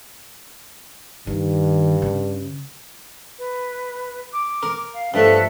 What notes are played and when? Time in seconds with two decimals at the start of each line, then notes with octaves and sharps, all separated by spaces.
1.27 G2 D#3
2.02 C#3
3.38 B4
4.32 D6
4.63 A#4
4.93 F5
5.14 G2 F3 A3 A4 E5 F#6